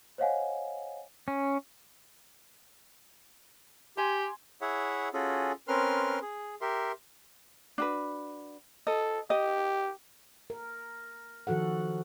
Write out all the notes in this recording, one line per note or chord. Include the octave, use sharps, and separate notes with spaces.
C5 C#5 D#5 F5 F#5 G#5
C#4
G4 G#5 C6
E4 G#4 C#5 E5 F#5
C#4 F4 F#4 G#4 A4
C4 C#4 A#4 B4 C6 F6
G#4
G4 A#4 E5 C6
D4 F#4 B4
A4 D#5
G4 D#5
A#4
D#3 F3 F#4 A4 F#5